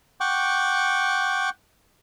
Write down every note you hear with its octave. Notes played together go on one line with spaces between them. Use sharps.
F#5 G5 C#6 D6